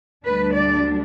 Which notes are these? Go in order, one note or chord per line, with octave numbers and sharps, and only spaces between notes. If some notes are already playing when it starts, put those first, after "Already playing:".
D2 D3 G3 D4 B4
D5